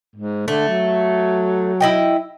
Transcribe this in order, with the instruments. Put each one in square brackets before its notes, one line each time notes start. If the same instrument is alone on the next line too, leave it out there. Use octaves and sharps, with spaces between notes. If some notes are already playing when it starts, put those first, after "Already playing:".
[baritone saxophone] G#2
[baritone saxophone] D3 [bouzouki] A3
[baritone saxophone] F#3
[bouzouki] E4 D#5 G5